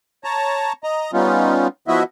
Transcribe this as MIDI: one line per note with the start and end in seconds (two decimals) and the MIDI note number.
0.24 0.73 73
0.24 0.73 81
0.24 0.73 82
0.84 1.11 75
0.84 1.11 82
1.13 1.67 55
1.13 1.67 59
1.13 1.67 61
1.13 1.67 63
1.13 1.67 65
1.88 2.03 53
1.88 2.03 59
1.88 2.03 64
1.88 2.03 66
1.88 2.03 75
1.88 2.03 76